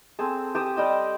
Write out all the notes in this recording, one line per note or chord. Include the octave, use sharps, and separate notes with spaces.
C4 G#4 A4
G4 A5 D#6
G3 D5 D#5 G5